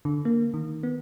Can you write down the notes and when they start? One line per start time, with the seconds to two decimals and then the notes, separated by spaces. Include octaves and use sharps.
0.05 D3
0.25 A#3
0.54 D#3
0.83 B3